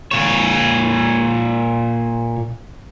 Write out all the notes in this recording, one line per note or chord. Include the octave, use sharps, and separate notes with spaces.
A#2 C#5